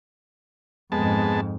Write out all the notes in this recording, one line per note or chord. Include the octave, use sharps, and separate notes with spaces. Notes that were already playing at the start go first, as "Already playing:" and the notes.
F2 G#2 G#3 B3 A5